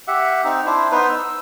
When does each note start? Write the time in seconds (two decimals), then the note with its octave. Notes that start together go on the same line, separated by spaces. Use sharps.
0.08 G4 E5 F#5
0.45 C4 D#4
0.66 D4 E4 C5
0.92 B3 D#4 B4 C5
1.09 E6